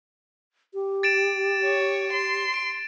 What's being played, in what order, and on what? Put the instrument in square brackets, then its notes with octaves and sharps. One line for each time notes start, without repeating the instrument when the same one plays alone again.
[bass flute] G4
[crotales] A6 D7 E7
[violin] C#5
C6
[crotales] D7